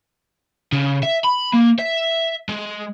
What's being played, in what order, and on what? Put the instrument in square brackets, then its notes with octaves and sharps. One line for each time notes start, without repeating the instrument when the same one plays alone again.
[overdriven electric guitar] C#3
E5
B5
A#3
E5
G#3